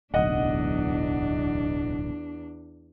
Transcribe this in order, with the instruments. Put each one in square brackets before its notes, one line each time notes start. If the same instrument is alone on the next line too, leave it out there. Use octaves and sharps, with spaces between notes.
[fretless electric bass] D1 B1 [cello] E2 D4 [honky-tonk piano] D#5 F#5